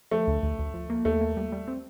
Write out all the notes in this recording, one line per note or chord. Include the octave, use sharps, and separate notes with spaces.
F3 A3
D2
D2
D2
F3
A#3
D#2 A3
A#3
G3
G3
C4